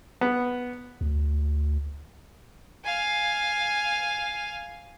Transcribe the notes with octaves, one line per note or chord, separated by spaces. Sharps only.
B3
D2
F5 G#5